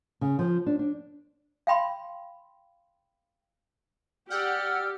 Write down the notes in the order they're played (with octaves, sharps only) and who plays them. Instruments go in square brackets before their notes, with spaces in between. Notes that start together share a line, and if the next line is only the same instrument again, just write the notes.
[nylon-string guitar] C#3
F3
D4
D4
[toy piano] F5 G5 B5 C6
[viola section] G4 [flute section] D5 E6 F6 [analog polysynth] F#5 G5